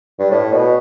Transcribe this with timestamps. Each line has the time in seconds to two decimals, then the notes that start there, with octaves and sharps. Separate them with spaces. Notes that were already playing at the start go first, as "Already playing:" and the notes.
0.19 G2
0.31 A2
0.53 B2